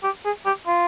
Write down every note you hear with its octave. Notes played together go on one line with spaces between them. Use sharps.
G4
G#4
G4
F4